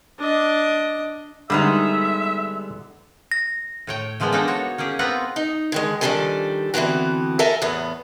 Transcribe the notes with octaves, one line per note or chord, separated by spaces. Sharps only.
D4 D#5
D3 G3 G#3 B3 D#4 E5
A#6
A2 C#5 G5
E3 F3 G#3 A#3 B3
G#3 A#3 B3 D4 D#4 A4
F#4 C#5
A#3 C#4 G4 G#4
B3 C4 F4 B4 F#5 A#5
D#4
D3 D#3 G#3
D#3 F3 G3 D4 A4 G#5
D3 E3 B3 C4 F#4
A4 A#4 E5 G#5 A#5
E2 A2 B3